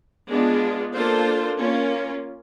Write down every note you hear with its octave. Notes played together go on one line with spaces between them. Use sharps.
G#3 B3 D4 F4
A#3 D4 F4 A4 C5
A#3 C#4 F4